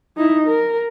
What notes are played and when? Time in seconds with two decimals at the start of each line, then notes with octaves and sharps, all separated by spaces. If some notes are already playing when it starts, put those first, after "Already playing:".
0.17 D#4 E4
0.47 A#4